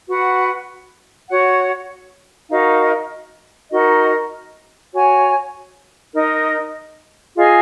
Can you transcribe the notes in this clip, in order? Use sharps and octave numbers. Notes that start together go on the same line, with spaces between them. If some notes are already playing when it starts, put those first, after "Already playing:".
F#4 B4 F#5
F#4 C#5 F#5
D#4 F#4 A#4 F5
D#4 F#4 A#4 D#5
F#4 C#5 G#5
D#4 A#4 D#5
F4 G#4 D#5 G#5